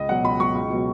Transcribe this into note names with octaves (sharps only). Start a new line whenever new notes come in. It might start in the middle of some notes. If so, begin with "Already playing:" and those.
Already playing: C#2 D#5
B2 F#3 F#5
C#2 B5
B2 F#3 C#6
C#2
B2 F#3